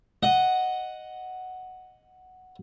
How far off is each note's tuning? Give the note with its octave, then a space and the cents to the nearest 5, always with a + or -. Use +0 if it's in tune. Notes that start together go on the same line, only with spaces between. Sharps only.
D#5 +0 F#5 +0